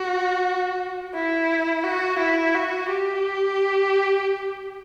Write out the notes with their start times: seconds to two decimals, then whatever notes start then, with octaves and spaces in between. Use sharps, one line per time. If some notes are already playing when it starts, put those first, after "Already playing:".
Already playing: F#4
1.14 E4
1.84 F#4
2.19 E4
2.55 F#4
2.89 G4